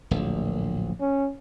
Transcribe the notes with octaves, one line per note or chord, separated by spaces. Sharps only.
D1 A#1
C#4